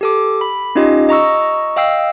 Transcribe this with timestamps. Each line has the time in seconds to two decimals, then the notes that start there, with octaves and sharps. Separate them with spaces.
0.01 G4 A4 D6
0.41 B5
0.75 C#4 D#4 F4 G4 D#5
1.09 D#5 A#5 C#6 E6
1.76 D#5 F5 G5 E6 C7